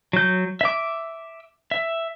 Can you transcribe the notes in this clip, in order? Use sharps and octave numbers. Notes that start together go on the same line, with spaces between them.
F#3 G6
E5 D6
E5